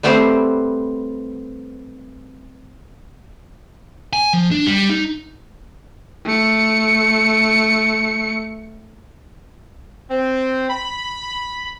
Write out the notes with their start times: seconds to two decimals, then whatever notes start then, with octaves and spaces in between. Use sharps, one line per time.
0.03 G3 A3 B3 C4 G4 C5
4.13 G#5
4.33 F3
4.51 D4
4.66 G3
4.90 D#4
6.25 A3 C#7
10.10 C4
10.70 B5